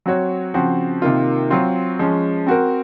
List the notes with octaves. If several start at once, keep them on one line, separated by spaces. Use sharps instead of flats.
F#3 C4 F#4 C#5
C#3 F3 C4 F#4
C3 D#3 A#3 F4
F#3 C4 F4
F3 G#3 C#4
C4 F#4 A#4